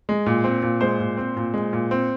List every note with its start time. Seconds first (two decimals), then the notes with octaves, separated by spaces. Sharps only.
0.09 G#3
0.26 A#2
0.44 C4
0.62 A#2
0.81 G#3 C5
1.00 A#2
1.17 C4
1.37 A#2
1.54 G#3
1.73 A#2
1.91 C4